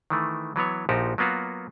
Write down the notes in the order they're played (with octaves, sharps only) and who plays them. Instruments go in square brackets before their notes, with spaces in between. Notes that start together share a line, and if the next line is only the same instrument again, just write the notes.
[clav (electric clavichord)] D#3 E3 A3
E3 F#3 B3 C#5
A#1 A#2 F3 D#4 F#4 G4
F#3 A#3 B3 F4 F#4